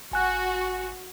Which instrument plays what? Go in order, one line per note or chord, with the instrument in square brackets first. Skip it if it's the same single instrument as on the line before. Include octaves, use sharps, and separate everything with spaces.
[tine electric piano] G#1 G#5 F#6 [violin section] F#4